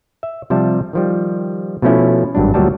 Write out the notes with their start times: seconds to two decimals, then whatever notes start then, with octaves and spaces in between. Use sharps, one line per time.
0.23 E5
0.50 C3 F3 G3 E5 A5
0.93 D#3 F3 G3
1.82 B2 F3 A3 C#4 E4
2.35 G#1 G2 F#3 D4
2.54 D2 A#2 F#3 G3 A5